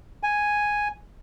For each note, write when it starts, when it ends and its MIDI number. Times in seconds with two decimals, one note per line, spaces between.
0.23 0.88 80